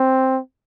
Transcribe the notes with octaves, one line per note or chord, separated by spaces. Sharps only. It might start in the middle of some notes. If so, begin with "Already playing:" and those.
Already playing: C4